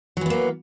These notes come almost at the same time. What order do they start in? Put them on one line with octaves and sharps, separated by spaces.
F#3 E3 B3 A#3